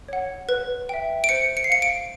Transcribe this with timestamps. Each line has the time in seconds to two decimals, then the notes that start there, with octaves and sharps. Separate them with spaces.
0.08 C#5 F#5
0.49 B4
0.89 E5 G5
1.24 D7
1.29 C5 C#7
1.57 C#7
1.64 C7
1.70 F5 C#7
1.82 D7